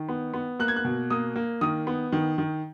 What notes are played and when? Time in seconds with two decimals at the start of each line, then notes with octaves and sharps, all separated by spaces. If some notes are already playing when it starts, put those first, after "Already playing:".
Already playing: D#3
0.09 B3
0.34 B3
0.59 A#3 F#6
0.68 G#6
0.76 F#6
0.85 B2
1.10 A#3 D#6
1.36 A#3
1.61 D#3 D#6
1.87 B3
2.12 D#3
2.38 D#3